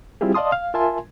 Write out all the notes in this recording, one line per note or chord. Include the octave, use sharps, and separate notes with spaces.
G3 C4 E4 F4 G4 G#4
D5 D#5 F5 A5 C6 D#6
F5
F4 A#4 E5 G#5 A5 C6